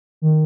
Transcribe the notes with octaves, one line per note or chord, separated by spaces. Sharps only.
D#3